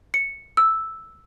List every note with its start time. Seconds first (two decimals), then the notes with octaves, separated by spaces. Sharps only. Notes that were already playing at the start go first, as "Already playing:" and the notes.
0.14 C#7
0.57 E6